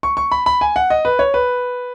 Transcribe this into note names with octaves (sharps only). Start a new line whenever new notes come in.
C#6
C#6
B5
B5
G#5
F#5
D#5
B4
C#5
B4